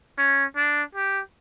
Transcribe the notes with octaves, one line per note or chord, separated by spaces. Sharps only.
C#4
D4
G4